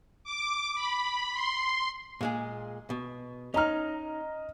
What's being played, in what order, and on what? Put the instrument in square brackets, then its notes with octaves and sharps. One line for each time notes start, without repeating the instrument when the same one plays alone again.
[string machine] D6
B5
C6
[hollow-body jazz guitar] A#2 G#3 G#4
B2
[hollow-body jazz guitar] C#4 D#4 [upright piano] D#5 A#5 F6